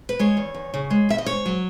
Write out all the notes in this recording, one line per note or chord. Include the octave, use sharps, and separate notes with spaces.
B4
G#3 C#5
E2
E2
C#3
G#3
E2 E5
D#5
G#2 C#5
F#3